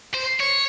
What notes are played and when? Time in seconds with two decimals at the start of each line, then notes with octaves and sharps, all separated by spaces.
0.14 C5
0.40 C#5